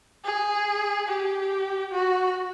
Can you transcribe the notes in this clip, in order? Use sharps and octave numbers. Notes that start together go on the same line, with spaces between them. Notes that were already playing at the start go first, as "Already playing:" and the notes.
G#4
G4
F#4